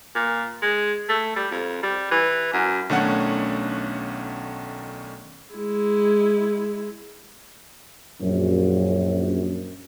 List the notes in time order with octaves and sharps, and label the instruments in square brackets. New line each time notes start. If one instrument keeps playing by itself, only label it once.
[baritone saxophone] A#2
G#3
A3
G3
F2
G3
E3
F#2
[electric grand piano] B1 D#3 A3 C#4 D4 F#5
[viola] G#3 E4
[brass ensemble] A#1 F#2